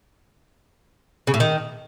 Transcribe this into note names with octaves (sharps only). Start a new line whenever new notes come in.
C#3
A2
D#3